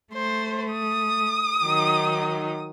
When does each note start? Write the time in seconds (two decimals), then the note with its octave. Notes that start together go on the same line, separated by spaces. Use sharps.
0.14 A3 C5
0.73 D#6
1.63 D#3 F#3 D#4